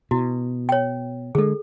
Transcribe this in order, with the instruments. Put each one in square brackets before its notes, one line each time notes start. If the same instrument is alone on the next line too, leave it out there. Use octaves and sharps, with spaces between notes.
[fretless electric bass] B2 [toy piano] E4 F#4
[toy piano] C#5 G5
[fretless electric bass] D3 G#3 [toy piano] G#4 A4